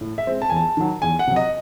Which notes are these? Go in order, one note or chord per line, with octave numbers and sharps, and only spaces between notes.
A2
E5
G#3 C4
A5
E2 G#5
A5
D#3 F#3
E2 G#5
F#5
C3 F#3
D#5